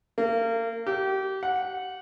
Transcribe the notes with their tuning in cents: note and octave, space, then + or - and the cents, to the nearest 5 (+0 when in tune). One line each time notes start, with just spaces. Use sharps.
A#3 -35
G4 -30
F#5 -15